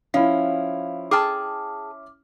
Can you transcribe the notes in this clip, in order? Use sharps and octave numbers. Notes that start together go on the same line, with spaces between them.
F3 C#4 E4 F5
G#4 G5 A5 D6 F6